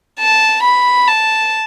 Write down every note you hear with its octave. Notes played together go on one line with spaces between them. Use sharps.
A5
B5
A5